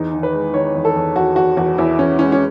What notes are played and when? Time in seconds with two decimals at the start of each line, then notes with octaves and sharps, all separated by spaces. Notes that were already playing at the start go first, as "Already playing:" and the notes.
Already playing: E2 D#4
0.13 D#3
0.23 B4
0.33 G#3
0.53 D#3 C#5
0.75 E2
0.85 A4
0.96 E2
1.15 E2 F#4
1.36 E2 F#4
1.57 E2 F#4
1.78 E2 E4
1.99 E2 C#4
2.19 G#3 C#4
2.32 C#4